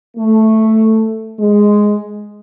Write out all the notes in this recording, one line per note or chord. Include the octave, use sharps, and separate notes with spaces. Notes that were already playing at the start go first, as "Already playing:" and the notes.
A3
G#3